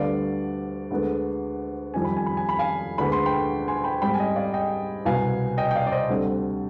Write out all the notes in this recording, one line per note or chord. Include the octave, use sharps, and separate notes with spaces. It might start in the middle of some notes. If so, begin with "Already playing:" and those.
Already playing: D2 D3 G3 B3 D5 F5
D2 D3 G#3 B3
F2 D#3 G3 C4 G#5
B5
G#5
B5
G#5
B5
F5 G#5
D2 D3 G#3 B3 B5
C6
G5 B5
G#5 C6
G5 B5
G#2 G3 C4 G5 B5
G#5
D#5 G5
D5 F5
D#5 G5
C2 B2 B3 F5 G#5
D#5 G5
G5
D5 F5
D5
C5 D#5
D2 D3 G3 C4